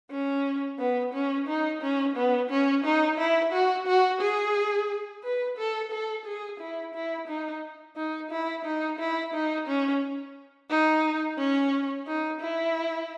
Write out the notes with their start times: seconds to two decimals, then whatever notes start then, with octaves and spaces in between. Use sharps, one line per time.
0.11 C#4
0.79 B3
1.14 C#4
1.47 D#4
1.82 C#4
2.16 B3
2.50 C#4
2.84 D#4
3.18 E4
3.52 F#4
3.87 F#4
4.21 G#4
5.24 B4
5.58 A4
5.92 A4
6.26 G#4
6.60 E4
6.95 E4
7.28 D#4
7.96 D#4
8.31 E4
8.65 D#4
8.99 E4
9.34 D#4
9.68 C#4
10.70 D#4
11.38 C#4
12.07 D#4
12.41 E4